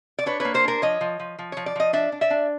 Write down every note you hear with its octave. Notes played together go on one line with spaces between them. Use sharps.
D5
D4 B4 C#5
A#3 B4 C#5
A#4 C5
D4 A#4 C5
F3 C#5 D#5
F3
F3
F3
F3 C#5
D5
F3 D#5
D4 D5 E5
D4
D5 E5
D4